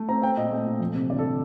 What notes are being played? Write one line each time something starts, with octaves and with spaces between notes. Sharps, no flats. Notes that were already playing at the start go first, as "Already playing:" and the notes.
Already playing: A3
C4 A#5
C4 G5
A#2 D#5
A3
A#2
F2
C3
G1 D5
A4